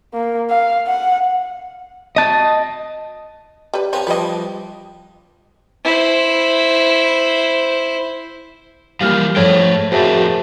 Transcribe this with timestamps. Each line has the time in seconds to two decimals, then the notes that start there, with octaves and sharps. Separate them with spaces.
0.14 A#3
0.50 F5
0.87 F#5
2.16 D#5 A5
3.74 G3 B4
3.93 F3 C4 C#4 B4
4.07 F3 G3 D4 B4 D#5
5.84 E4 C5
9.01 E3 F3 G3 A#3 G4 F5 F6 G6
9.36 G#2 F3 A3 D4 A4 C#5 G5 B5
9.92 F2 A2 F#4 G#4 A#4 C5 E5 A5